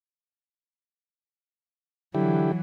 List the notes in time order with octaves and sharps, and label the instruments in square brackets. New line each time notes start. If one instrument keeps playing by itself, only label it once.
[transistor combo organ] D3 E4 G4 [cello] E3 F#3